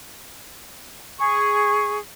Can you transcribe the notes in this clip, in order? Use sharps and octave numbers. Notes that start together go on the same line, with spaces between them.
G#4 C#6